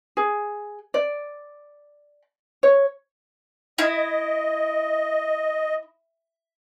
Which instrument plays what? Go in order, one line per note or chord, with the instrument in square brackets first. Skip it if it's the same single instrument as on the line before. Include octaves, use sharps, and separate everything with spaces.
[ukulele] G#4
D5
C#5
[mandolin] E4 [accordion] D#5